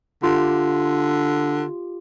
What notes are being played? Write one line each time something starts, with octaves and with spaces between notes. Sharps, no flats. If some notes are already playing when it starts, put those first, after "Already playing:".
D3 F4 G4